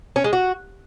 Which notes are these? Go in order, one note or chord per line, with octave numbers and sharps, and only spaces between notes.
C#4
G#3
F#4